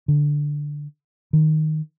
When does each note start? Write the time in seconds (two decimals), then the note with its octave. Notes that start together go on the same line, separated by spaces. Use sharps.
0.08 D3
1.33 D#3